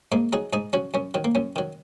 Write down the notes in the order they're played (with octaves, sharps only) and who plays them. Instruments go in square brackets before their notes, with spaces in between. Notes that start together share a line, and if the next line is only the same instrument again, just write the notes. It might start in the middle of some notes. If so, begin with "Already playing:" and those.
[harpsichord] G#2 A#3 D#4
F#3 D#4 G#4
G#2 D#4 G#4
F#3 C#4 F#4
F#2 C#4
D#3 F#3
A#3
F#2 C#4
D#3 F#3